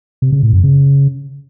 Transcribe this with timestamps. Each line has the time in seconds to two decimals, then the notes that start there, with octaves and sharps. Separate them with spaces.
0.22 C3
0.32 C#3
0.43 A2
0.53 F#2
0.63 C#3